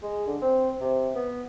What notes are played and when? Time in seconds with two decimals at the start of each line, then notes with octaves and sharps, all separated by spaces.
0.02 G#3
0.27 D3
0.42 C4
0.80 C3
1.15 B3